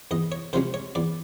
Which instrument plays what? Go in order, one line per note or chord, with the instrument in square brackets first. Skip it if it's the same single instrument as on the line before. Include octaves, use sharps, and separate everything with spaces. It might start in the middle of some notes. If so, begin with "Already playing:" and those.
[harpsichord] E2 D#5
C#5
C3 F3 G#3 C#4 C5
C#5
E2 D5